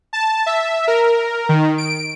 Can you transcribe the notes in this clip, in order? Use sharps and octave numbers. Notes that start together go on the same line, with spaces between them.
A5
E5
A#4
D#3
D7